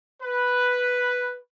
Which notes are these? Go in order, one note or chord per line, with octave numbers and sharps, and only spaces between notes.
B4